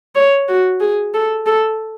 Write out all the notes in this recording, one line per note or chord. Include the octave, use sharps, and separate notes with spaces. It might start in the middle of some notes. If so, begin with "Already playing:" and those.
C#5
F#4
G#4
A4
A4